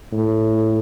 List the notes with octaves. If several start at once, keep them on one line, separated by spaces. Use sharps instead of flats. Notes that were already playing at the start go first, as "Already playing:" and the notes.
A2